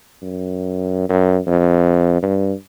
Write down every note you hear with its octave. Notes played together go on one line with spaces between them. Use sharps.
F#2
F#2
F2
G2